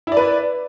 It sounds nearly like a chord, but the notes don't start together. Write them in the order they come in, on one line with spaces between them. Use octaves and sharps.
E4 D5 B4